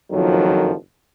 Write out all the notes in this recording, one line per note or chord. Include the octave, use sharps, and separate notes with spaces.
F#1 F2 D#3 F3 F#3